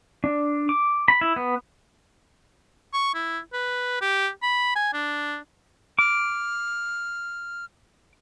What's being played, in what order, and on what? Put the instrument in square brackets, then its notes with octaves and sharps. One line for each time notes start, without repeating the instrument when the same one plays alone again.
[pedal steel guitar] D4
D6
B5
E4
B3
[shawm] C#6
E4
B4
G4
B5
G#5
D4
[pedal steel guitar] D6 [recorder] F6